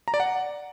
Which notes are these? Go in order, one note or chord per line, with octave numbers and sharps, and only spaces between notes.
A#5
D5
F#5